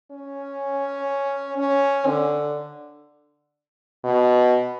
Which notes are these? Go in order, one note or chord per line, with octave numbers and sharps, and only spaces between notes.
C#4
C#4
D3
B2